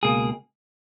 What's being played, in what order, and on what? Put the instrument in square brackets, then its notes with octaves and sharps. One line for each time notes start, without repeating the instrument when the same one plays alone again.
[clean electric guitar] C#2 B2 A#3 G#4